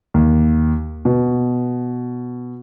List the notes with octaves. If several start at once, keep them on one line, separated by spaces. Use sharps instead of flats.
D#2
B2